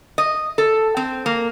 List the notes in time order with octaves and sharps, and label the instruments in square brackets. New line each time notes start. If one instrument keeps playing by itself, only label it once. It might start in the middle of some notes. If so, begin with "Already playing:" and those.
[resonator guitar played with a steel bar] D#5
A4
C4
A#3